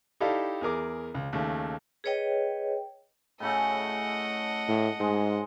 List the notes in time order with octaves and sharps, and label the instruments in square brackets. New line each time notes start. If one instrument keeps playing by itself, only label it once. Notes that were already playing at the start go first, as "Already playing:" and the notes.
[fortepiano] D#4 E4 G4 A4 D5 F5
E2 G#4 A#4 D6
C#2
D#2 C#3 A3
[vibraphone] G#4 B4 C#5 D#5 G5
[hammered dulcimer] A2 C#3 A3 [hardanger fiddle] D#5 F#5
[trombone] A2
[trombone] G#2 [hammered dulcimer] G#3